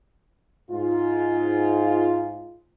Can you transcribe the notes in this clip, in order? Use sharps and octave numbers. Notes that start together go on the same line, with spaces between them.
G#2 F4